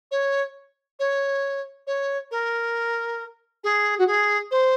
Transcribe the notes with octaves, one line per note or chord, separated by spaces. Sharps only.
C#5
C#5
C#5
A#4
G#4
F#4
G#4
C5